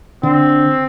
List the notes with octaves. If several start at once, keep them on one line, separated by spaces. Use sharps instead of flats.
D3 C4